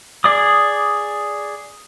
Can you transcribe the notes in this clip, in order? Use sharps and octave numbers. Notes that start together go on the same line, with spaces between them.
G#4 D5 D6 D#6